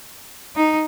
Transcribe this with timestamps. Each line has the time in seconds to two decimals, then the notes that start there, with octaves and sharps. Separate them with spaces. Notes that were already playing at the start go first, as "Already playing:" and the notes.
0.56 D#4